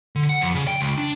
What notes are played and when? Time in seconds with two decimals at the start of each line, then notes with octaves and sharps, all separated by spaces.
0.16 D3
0.29 F#5
0.41 F2
0.55 C#3
0.67 G5
0.81 C#2
0.98 D4